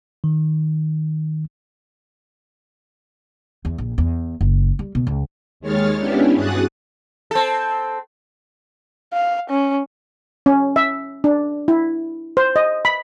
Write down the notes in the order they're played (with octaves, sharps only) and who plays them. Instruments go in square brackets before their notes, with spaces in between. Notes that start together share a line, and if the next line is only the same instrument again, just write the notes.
[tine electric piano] D#3
[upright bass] E2
A#1
E2
F#1
G3
B2
C#2
[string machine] D#2 D#3 G#3 C#5 F6 A6
B3 C#4 D4 E4 G4
G2 F#4 G#4 D#6 F#6 A6
[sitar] C4 A4
[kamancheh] F5
C#4
[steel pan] C#4
E5
D4
E4
C5
D#5
B5